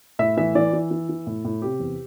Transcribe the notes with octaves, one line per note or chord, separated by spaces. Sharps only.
A2 E5
E3 E5
E3 D5
E3
E3
E3
A2
A2
C3 G4
E2